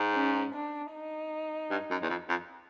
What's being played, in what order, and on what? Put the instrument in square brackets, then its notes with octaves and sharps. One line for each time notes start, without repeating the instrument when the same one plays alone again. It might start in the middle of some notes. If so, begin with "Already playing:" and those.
Already playing: [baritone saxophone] G#2
[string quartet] C#4
D4
D#4
[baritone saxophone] G2
F#2
E2
F2
F2